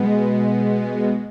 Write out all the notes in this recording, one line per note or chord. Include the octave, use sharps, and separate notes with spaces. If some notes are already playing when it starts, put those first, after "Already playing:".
Already playing: B2 G#3 B3